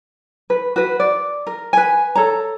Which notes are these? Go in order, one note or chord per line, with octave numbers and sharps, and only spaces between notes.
B4
F#4 B4
D5
A#4
B4 G#5
A4 C#5 A#5